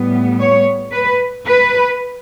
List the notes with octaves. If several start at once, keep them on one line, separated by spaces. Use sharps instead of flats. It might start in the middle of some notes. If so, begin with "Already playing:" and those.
Already playing: A2 G3 B3
C#5
B4
B4